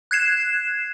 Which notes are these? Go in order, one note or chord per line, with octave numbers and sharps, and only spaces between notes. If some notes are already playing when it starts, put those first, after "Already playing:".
F#6 G#6 C7 E7